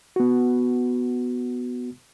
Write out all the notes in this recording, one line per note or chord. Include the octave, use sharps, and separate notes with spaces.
B3 F#4